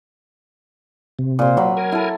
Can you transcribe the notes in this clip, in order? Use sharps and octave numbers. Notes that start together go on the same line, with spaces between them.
C3
A#2 C5
F#3 B5
A#4 G#5
E4 A4